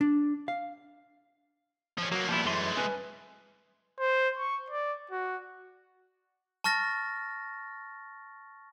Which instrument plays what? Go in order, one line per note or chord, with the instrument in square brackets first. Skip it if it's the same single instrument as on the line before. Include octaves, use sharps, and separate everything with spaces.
[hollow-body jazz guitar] D4
F5
[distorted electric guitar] F3 C#4
[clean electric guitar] F#3 [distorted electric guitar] A#3 B3
[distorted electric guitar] A#2 B3 [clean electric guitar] F3 G3 E4
[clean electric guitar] F#2 E3 C6 [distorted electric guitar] G#3 A3
[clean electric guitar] C#4 B4
[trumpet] C5
C#6
D5
F#4
[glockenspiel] A5 C#6 F6 A6 A#6